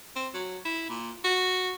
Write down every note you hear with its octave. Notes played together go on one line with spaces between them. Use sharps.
C4
F#3
E4
A#2
F#4